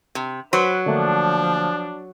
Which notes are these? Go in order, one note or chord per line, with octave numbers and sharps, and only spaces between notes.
C3
F#3 B4 C5 C6
D3 F3 A3 A#3 D4